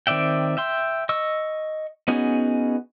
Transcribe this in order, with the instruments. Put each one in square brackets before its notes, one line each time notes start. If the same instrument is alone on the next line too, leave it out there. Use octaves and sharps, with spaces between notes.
[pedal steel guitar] D#3 C4 D5 E5 G5
E5 G5 C6
D#5 C#6 E6
B3 C#4 D#4 F#4 G#4